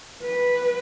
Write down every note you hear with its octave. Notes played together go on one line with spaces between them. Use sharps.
B4